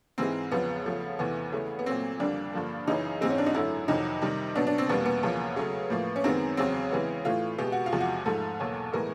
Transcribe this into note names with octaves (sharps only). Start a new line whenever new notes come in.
G#2 E3 G#3 C4
E2 C#3 F3 B3
C#3 F3 A3
E2 C3 E3 A3 B3
C#3 E3 A3
B3
A#2 F#3 A3 C4
F2 D3 G3 A#3 D4
G2 D3 F3 A#3
F#2 C#3 E3 D#4
G#2 E3 G#3 C4
C#4
D4
D#4
F#2 D3 F#3 A3 E4
F2 C3 D#3 F#3 D#4
C3 D#3 G3
B2 F#3 B3 D4
D4
C4
E2 B2 G3 A#3 B3
B3
E2 C#3 F3 A#3
C#3 F#3 A3
A2 F3 A#3
C#4
F#2 D#3 G#3 B3 C4
E2 C#3 F#3 C4
C#3 E3 G#3 B3
A2 E3 A3 F4
B2 G#3 B3 G4
F#4
F4
E2 C3 F3 G#3
F#4
G#2 F3 A3 A4
E2 B2 F#3 A#3
A2 E3 G#3 B3 A#4